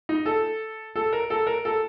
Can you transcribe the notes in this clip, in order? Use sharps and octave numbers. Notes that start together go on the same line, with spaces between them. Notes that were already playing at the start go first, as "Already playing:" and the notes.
D#4
A4
A4
A#4
A4
A#4
A4